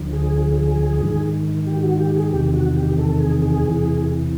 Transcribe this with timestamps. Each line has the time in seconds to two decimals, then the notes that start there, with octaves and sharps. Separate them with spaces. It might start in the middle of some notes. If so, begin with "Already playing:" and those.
Already playing: D2 D3 F3
0.13 G#4
1.01 G#2 D#3
1.66 G4
1.83 F#4
2.00 G4
2.16 G#4
2.33 E2 C3 D#3 G4
2.54 F#4
2.76 G4
2.99 A4
3.20 G#4
3.42 G#4
3.64 E2 C3 E3